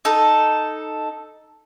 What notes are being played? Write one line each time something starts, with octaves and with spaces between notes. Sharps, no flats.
D#4 A4